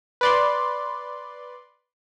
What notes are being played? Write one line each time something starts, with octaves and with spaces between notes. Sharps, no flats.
B4 D5 C6